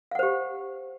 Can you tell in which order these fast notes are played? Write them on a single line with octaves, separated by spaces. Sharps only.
F5 F#5 C5 G4